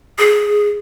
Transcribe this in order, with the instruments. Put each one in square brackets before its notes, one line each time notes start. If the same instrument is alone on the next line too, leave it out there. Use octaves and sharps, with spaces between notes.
[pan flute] G#4